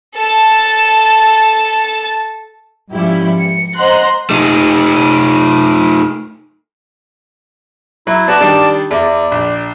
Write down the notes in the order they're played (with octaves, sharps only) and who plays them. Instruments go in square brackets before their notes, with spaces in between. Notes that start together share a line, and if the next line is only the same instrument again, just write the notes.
[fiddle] A4 A5
[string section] G#2 F3 G3 C#4 E4 G4
C#7
C5 D#5 F#5 A#5 C6 F#6
[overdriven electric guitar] A3 D#4
[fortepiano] F#3 [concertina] E4
[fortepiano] B3 F#4 [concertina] D5 A5
[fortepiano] D#3 G3 D4
[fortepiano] E2 [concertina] D5
[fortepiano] A#1